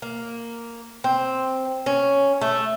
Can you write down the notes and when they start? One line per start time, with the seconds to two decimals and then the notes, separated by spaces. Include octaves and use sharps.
0.02 A#3
1.04 C4
1.86 C#4
2.41 A3